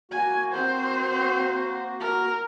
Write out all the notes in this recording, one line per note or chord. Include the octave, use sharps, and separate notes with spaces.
A#3 F#4 G#5
C4 C5
A#4